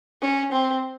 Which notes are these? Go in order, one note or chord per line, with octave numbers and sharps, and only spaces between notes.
C#4
C4